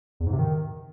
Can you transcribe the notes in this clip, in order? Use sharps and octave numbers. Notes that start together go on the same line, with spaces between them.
E2
G#2
C3
D#3